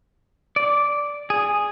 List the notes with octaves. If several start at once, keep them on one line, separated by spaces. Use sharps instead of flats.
D5
G#4